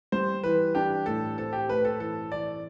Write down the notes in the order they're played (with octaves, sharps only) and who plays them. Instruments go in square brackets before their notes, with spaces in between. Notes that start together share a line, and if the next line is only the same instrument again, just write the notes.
[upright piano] G3 [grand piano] C5
[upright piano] E3 [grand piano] B4
[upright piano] D4 [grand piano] G4
[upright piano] A2 [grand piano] A4
[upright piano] C4 [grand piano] A4
[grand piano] G4
[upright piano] A3 [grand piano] B4
[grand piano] A4
[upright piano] E3 [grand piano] A4
[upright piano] E3 [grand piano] D5